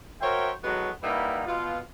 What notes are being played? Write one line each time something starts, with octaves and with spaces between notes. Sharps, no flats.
F#4 A#4 C5 C#5 E5 G5
A2 F#3 G#3 B3 F#4
G3 A#3 D#4 E4 B4 F#5
B2 F4